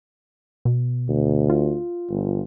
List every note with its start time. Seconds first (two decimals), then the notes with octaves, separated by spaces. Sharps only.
0.65 B2
1.09 D2
1.49 F4
2.10 G1